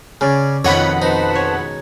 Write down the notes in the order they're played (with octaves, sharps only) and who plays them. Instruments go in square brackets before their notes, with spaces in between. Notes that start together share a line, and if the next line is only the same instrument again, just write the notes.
[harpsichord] C#3 [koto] C#4 D5
[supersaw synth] F2 F#5 B5 [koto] B2 D#3 D#5 [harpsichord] C#5
[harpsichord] D#4 [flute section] B4 C5 A5
[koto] G#3 C#5